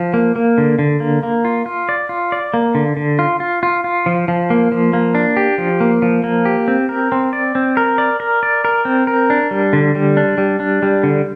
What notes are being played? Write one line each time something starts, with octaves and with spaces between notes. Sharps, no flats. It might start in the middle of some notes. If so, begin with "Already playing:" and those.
Already playing: F3
A#3
A#3
D3
D3
A#3
A#3
F4
F4
D5
F4
D5
A#3
D3
D3
F4
F4
F4
F4
F3
F3
A#3
F3
A#3
D4
G4
F3
A#3
F3
A#3
G4
C4
A#4
C4
D5
C4
A#4
D5
A#4
D5
A#4
C4
A#4
D4
G3
D3
G3
D4
G3
D4
G3
D3